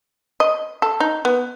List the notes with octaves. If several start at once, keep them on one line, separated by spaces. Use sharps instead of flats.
D#5
A4
D#4
B3